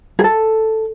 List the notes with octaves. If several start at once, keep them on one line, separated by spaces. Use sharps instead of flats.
G#4
A4